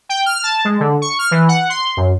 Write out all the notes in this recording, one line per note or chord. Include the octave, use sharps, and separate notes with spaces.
G5
F6
A5
G#3
D3
C#6
F6
E3
F#5
C6
F#2